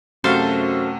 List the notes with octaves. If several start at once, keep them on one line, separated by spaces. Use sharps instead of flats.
F#2 C3 A3 F#4 A4 C5 F5